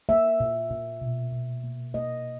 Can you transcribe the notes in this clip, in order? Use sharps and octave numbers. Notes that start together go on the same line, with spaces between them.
A#3 E5
A#2
A#2
B2
B2
A#3
A#3 D#5